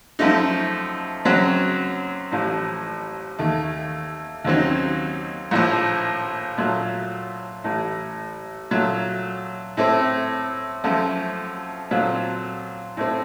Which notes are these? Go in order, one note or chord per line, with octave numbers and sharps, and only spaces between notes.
F#2 F3 A3 D#4
F#2 C#3 F#3 C4
A1 A2 F3
D#2 D#3 A3
D#2 C#3 F#3 C4 D#4
A#1 A2 F3
A#2 F#3 A3
A1 A2 A3
A#2 F#3 A3
A2 A3 C4
F#2 F3 A3
A#2 F#3 C4 F4 A4
A2 A3 C4